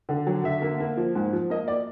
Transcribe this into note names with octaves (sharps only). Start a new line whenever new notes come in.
D3
F#3
D3 E5
A#3
A#3
F3
G#2
F3
A#3 D#5
D5